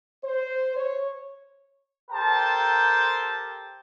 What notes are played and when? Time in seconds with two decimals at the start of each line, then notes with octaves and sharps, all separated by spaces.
0.24 C5
0.76 C#5
2.11 G4 A4 A#4 C5 G5 A5